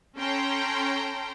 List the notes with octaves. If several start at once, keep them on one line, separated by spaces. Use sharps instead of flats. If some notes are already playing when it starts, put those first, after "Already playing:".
C#4 A4 G5 A#5 C6